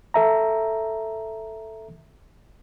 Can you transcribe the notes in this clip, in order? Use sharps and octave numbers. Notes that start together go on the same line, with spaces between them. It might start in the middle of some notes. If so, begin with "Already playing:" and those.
A4 E5 A#5